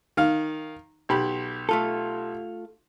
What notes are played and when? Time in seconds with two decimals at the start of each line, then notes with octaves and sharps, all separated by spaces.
0.17 D#3 F5
1.09 B1 G4 B5
1.69 A3 F4 A4